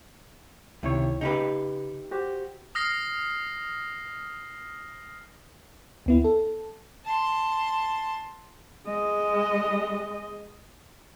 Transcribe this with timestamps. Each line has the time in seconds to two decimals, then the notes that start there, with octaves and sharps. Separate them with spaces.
0.83 C#2 C3 D#3 E4 C#5
1.21 C#3 D#4 G4 B4
2.11 F#4 G4 C5
2.75 D#6 F6 A#6 C7
6.06 D2 B3 E4
6.24 A4
7.05 A5 C6
8.87 G#3 D#5